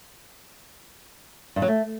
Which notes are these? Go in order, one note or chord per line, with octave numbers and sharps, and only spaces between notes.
G2
F#3
A3